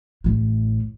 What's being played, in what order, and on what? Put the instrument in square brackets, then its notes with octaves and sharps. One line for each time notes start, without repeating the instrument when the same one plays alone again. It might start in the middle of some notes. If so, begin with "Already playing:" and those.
[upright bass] A1 A2